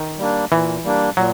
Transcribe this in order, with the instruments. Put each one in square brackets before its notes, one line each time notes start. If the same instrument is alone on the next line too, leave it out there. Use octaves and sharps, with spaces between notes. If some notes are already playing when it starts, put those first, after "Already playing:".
Already playing: [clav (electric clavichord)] D#3
[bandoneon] G3 A#3 D4
[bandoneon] A#2 [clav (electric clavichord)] E3
[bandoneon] G3 A#3 D4
[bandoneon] A#2 [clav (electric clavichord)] F#3